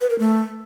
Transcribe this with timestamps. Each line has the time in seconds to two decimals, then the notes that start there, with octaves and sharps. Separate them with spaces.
0.01 B4
0.10 A#4
0.19 A3